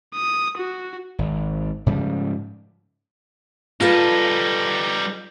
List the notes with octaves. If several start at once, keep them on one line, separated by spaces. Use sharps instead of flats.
D#6
F#4
G#1
G#2 C#3 F3 G3
G3 D#4 F4 A4 B4 A5